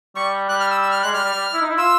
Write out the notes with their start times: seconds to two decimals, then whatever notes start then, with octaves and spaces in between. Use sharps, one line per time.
0.15 G3 C#6
0.48 G3 F#6
0.59 F6
0.70 E6
0.81 E6
0.91 F6
1.02 G#3 F#6
1.12 G3 F6
1.24 G3
1.34 G3
1.53 E4
1.61 D#4
1.69 E4
1.77 F4 E6